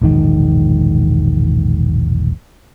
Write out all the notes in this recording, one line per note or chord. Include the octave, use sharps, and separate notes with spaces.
E1 A#1 G#2 D#3